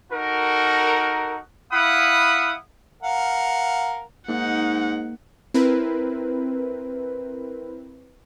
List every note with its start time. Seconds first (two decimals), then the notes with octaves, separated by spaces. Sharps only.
0.12 D#4 F#4 A4 A#4
1.72 E4 F5 F#5 B5 D#6
3.02 A#4 F5 F#5
4.28 G#2 A#3 D#4 F#5
5.54 C4 E4 A#4 B4